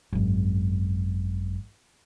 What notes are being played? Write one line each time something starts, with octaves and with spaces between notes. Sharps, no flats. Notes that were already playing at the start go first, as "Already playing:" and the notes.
G#1 F#2